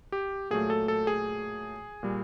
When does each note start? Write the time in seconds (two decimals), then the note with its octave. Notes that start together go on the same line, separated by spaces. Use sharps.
0.12 G4
0.50 A#2 F#3 A3 G#4
0.70 A4
0.88 A4
1.07 G#4
2.03 A#2 G3